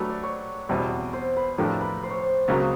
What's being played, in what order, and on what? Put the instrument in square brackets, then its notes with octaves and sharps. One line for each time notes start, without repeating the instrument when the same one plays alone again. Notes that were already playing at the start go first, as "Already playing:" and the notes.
Already playing: [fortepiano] F#3 A3 D4 G4 B4
[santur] D5
C#5
[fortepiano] E2 B2 G3 C4
[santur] C5
B4
[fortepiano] A2 F3 A3 D4 G4 [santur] A#4
[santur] B4
C5
C#5
C5
[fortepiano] C#2 C#3 F#3 A#3 [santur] D#5